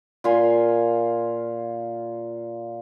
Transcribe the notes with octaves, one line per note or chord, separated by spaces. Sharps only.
A#2 F4 G#5 C6